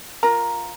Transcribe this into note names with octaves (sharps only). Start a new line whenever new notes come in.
F4 A#4 A#5